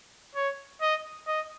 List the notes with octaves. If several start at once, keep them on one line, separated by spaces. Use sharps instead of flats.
C#5
D#5
D#5